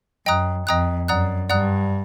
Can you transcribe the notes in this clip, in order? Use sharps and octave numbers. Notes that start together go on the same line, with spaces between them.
F#2 D#5 G5 A#5 D#6 F#6
F2 D#5 G5 A#5 D#6 F#6
F#2 D5 F#5 A#5 D#6 F#6
G2 D5 F#5 A#5 D#6 F#6